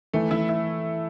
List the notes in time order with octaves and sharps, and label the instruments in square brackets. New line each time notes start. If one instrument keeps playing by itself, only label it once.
[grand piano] E3 [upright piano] A3
[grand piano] E3 [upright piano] E4
[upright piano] E4